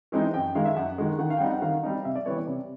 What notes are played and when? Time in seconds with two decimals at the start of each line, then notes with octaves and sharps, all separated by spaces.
0.12 E3 G#3 C4 D#4
0.34 F#2 G5
0.55 D#3 G#3 F5
0.65 E5
0.76 F#2 F#5
0.98 D#3 G#3
1.19 D#3 F#5
1.30 F5
1.37 G5
1.40 G3 C4 D#4 F#5
1.51 F#5
1.62 D#3 F5
1.83 G3 C4 D#4
2.05 C3 E5
2.15 D5
2.26 E3 G3 B3 C#5
2.37 D5
2.48 C3